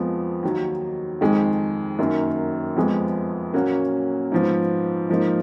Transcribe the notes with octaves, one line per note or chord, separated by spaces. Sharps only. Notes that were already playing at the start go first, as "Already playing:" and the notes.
Already playing: F2 F3 G#3 B3
D#2 D#3 F#3
F2 D#3 G#3
F#2 D#3 F#3 A#3
F2 F3 G#3 B3
A#2 F#3 A#3 C#4 F#4
G#2 F3 B3
G#2 F3 A#3 D#4